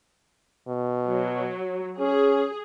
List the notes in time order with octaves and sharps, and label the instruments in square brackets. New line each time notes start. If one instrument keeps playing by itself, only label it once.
[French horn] B2
[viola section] F#3
[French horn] C#4 [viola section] G#4